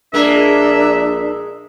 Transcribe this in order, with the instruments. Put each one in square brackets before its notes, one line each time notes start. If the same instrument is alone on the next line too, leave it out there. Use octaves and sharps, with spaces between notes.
[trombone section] A#1 A#4 [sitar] G#3 A#3 [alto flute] D4 [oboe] E5